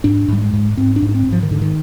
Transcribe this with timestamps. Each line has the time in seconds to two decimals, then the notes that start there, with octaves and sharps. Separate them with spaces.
0.04 G#2 D4
0.28 G#2 G3
0.41 G#3
0.53 G#2
0.77 G#2 C4
0.96 D4
1.02 G#2
1.09 D4
1.14 C4
1.27 G#2
1.32 F3
1.43 D#3
1.51 G#2 D3
1.62 D#3